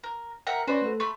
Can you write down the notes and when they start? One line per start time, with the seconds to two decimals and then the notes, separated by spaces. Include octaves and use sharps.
0.04 A#4
0.47 A#4 E5 F#5 G5
0.67 C#4 F#4 B4 C5 D5 C6
0.82 A3 A4
1.00 A3 B5 C6